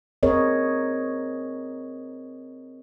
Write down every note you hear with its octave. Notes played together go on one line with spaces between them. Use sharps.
C4 G#4 A#4 C#5 D#5